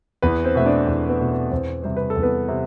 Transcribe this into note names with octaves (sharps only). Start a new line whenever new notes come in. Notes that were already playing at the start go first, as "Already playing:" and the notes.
E2 B3 B4
C4 C5
B2 A3 E5
D4 D5
E2
B3 B4
B2 A3
C4 C5
E2 C4 C5
C3 G3 C5
B4
A4
E2
B3 B4
C3